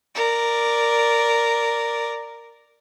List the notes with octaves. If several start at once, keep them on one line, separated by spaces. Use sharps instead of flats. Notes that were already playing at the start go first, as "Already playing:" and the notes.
A#4 D5